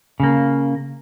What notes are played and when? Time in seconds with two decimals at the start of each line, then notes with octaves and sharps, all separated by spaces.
0.20 C#3 A#3